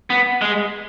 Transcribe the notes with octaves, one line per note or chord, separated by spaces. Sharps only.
B3
G#3